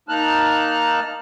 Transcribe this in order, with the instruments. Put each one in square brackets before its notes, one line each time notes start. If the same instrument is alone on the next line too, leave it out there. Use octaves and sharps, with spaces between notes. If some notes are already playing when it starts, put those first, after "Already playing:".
[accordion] A#3 D#4 A5 F6 F#6